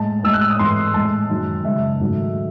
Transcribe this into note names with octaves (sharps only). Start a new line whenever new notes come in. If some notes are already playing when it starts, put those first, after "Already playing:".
Already playing: A2 G#3 A5
A2 G#3 E6
F#6
E6
D#6
G#2 E3 A3 C6
A2 G#3 A5
F#2 D#3 G#3
F#2 C#3 G#3 E5
G#2 D#3 F#3 A3